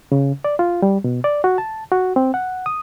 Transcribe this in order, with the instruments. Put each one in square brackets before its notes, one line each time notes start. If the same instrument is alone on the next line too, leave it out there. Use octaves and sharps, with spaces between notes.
[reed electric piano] C#3
D5
F4
G3
B2
D5
F#4
A5
F#4
C4
F#5
D#6